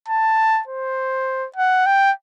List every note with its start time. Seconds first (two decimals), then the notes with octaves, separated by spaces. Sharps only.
0.08 A5
0.67 C5
1.56 F#5
1.86 G5